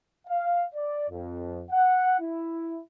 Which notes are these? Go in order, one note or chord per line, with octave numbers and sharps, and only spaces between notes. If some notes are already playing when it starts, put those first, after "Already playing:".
F5
D5
F2
F#5
E4